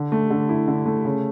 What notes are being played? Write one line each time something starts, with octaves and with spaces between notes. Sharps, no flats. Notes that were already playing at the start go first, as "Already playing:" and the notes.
Already playing: D3
A3
D3
E4
D3
A3
C#3